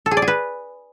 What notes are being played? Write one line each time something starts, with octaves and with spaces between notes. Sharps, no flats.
A4
G#4
D5
G#4
B4